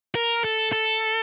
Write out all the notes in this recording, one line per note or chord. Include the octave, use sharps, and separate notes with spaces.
A#4
A4
A4